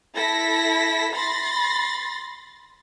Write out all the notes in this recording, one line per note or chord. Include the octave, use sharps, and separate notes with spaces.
E4 A4 A#6 B6
B5 C6 A6 A#6